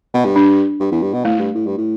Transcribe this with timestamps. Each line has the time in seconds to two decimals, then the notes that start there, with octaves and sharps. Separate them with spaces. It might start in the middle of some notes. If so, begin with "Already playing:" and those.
0.14 B2
0.25 G2
0.36 D4
0.80 G2
0.91 E2
1.02 G2
1.14 B2
1.25 A2 A3
1.39 G2
1.55 A2
1.66 G2
1.78 A2